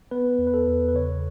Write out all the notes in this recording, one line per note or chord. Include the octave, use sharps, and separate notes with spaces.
B3 B4
E2
B4
A4
E2
B4
C#3 C#5